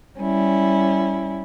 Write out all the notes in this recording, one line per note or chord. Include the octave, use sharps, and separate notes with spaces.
G3 C#4 E4